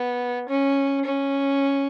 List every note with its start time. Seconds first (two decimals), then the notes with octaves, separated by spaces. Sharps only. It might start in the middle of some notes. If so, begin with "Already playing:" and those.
Already playing: B3
0.49 C#4
1.05 C#4